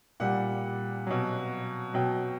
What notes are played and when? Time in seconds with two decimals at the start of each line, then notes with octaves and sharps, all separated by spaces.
0.20 A#2 G3 F#5
1.07 B2 F#3
1.94 B2 F#3 G5